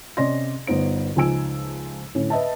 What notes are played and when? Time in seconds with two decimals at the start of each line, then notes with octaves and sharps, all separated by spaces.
0.17 C3 C#4 D5 D#5 C6 A#6
0.67 G1 B3 D#4 C5 D7
1.16 C#2 F3 D#4 G#5 E6 D7
2.15 A2 D3 C#4
2.30 B4 D#5 E5 A5